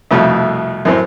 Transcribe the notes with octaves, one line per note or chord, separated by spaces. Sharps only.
C2 F2 B2 A3
F#2 A2 C4